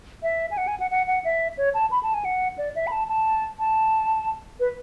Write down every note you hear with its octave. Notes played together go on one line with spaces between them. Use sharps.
E5
G#5
F#5
G#5
F#5
F#5
F#5
E5
C#5
A5
B5
A5
G#5
F#5
D5
E5
B5
A5
A5
A5
B4